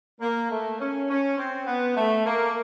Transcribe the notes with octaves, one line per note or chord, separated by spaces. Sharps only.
A#3
A3
C#4
C#4
C4
B3
A3
A#3